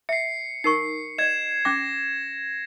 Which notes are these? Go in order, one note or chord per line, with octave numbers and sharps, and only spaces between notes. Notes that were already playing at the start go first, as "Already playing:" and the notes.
E5 C7 C#7
D#4 A#4 C#6 C7
D5 D#5 G#6 E7
C#4 G5 D6 A#6